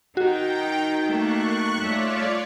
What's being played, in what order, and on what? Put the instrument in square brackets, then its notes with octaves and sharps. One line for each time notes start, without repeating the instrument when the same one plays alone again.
[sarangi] D#3 [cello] D#4 [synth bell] F#4 [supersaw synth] G5
[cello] A3 A#3 [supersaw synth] C#6 F#6
[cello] A3 E5 [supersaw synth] F4 C#5 D5